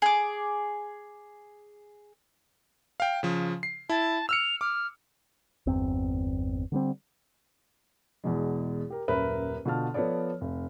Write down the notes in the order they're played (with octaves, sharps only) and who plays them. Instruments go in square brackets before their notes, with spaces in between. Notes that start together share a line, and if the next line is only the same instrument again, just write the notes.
[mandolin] G#4 D6
[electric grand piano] F5 G5
C#3 F3
C7
[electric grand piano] E4 [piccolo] A5
[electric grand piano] E6 F6 C#7 [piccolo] F7
[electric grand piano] D6 [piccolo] F6
[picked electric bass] G1 E2 C4
D3 G3 C4
[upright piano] E2 B2 G#3
G4 A#4
D#1 F#2 A#4 B4 E5
B2 D3 F4 A5 F6
F3 B3 A4 C#5 D5
F1